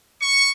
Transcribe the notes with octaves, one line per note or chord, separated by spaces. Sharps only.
C#6